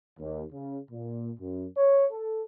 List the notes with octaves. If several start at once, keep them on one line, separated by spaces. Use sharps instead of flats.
D#2
C#3
A#2
F#2
C#5
A4